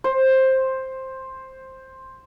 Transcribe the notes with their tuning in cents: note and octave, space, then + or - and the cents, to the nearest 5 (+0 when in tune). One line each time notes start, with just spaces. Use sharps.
C5 +10